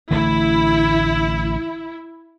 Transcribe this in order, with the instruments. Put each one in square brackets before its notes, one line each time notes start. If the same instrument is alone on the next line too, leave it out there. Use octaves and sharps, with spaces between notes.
[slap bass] A1 D3 A3 [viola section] E4